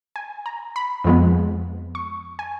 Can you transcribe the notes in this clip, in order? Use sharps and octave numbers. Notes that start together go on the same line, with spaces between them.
G#5
A#5
B5
F2 F3 G#3 B3
C#6
G#5